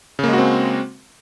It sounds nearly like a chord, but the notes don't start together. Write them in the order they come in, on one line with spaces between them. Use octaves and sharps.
C#3 A#3 G#3 F#4 C4